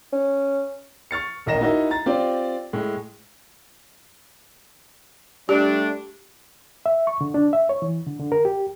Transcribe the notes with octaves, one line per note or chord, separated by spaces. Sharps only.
C#4
C#6 F6 A6 C#7
D#1 A1 A#4 D#5 A#6 E7
D#4 E4 F#4 A#4 D#5
A#5 A6
C4 F4 G4 D5
A2 G#3
G3 A3 D4 G4
E5
C#6
D3
D4
E5
C#5
E3
D3
D3
A#4
G4